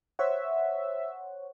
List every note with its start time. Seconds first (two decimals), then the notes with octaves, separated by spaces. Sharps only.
0.19 C5 C#5 E5 F#5